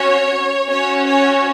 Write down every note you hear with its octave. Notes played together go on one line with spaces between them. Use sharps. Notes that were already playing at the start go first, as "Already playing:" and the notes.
Already playing: C#4 F#4 C#5
C#4 F#4 C#5
C#5